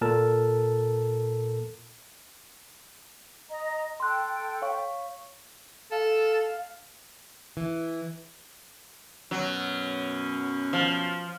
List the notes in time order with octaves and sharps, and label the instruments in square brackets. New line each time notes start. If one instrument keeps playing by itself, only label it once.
[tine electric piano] A#2 A4 A#4 A5
[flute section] D#5 A#5
[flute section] A4 G5 [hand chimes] C6 F#6
[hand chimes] C#5 F5 C#6
[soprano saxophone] A4 [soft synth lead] F5
[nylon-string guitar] E3
[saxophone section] F#2 B2 C#4 [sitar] F#3
[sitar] F3